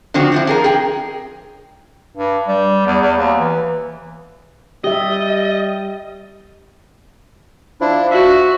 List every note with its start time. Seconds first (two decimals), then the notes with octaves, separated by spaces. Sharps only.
0.14 D3 F3 C4 D4 F#4
0.32 C4 D4 E4
0.47 F3 G#4 A#4
0.64 G#4 G5
2.17 G2
2.48 G3
2.86 E2
3.02 E2
3.18 D#2
3.39 E3
4.84 G3 G4 D#5 E5
7.81 F3 D4 E4
8.11 F#4 E5